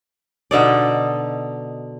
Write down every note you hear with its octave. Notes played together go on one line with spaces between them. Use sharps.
B2 D3 D#4 D5